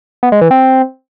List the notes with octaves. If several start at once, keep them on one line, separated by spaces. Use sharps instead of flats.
B3
G#3
E3
C4